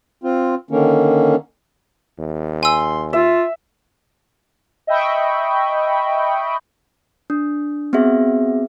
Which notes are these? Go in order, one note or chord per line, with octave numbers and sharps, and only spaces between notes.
C4 F4
D3 D#3 A#3 C#4
D#2
G#5 C6 E6
F4 E5
D#5 E5 G5 B5 C#6
D4
B3 C4 F#4 G#4 E5